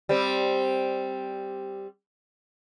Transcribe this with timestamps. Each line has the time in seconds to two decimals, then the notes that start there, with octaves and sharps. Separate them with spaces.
0.09 G3 C4